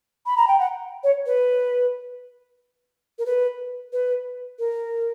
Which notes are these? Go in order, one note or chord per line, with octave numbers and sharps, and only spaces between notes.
B5
A#5
G5
F#5
C#5
B4
A#4
B4
B4
A#4